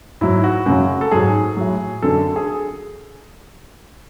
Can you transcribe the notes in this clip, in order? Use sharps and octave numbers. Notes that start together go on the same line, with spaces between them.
G#2 F#3 E4
F#4
F#2 C#3 F#3
A4
G#2 F#3 G#4
A2 F#3
F#2 D3 F#3 A4
G#4